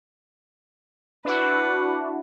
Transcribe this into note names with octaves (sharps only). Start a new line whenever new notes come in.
D4 E4 F#4 B4 F#5